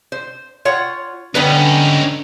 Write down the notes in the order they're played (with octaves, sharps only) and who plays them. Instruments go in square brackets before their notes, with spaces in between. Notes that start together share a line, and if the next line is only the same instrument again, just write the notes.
[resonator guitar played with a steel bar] C5
F4 C#5 F#5
[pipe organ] D3 [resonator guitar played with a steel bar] G3 B3 B4 [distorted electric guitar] C#4 D#4